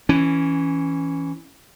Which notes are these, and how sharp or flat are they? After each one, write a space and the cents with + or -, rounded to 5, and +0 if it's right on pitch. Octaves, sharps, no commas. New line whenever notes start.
E3 +0 C#4 +0